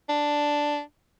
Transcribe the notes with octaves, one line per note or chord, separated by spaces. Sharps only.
D4